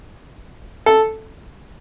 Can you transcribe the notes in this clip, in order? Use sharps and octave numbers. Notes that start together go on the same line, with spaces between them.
A4